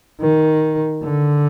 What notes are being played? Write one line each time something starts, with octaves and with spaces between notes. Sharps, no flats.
D#3
D3